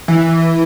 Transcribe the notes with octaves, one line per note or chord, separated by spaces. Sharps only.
E3